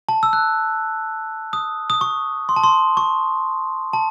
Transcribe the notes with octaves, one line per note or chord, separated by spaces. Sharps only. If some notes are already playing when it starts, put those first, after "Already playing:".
A5
E6
F#6
D#6
D#6
C#6
C6
A5
C6
C#6
A5